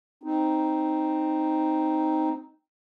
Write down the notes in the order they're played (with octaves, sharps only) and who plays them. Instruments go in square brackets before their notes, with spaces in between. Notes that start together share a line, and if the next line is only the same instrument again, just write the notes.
[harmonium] C4 D#4